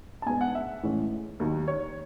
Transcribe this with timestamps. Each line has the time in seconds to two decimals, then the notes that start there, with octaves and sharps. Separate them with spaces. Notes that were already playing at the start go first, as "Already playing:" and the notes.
0.22 A5
0.26 B2 G#3 B3 G#5
0.41 F#5
0.55 E5
0.83 A2 E3 G#3 C#4
1.40 D#2 D#3 F#3
1.68 C#5